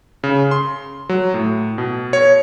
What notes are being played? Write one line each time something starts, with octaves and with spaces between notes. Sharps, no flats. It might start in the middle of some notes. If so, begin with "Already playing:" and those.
C#3
C6
F#3
A2
B2
C#5